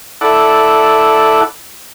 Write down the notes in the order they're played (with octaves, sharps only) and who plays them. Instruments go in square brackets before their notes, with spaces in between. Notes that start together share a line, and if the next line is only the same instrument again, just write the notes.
[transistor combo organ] E4 A4 D5 F#5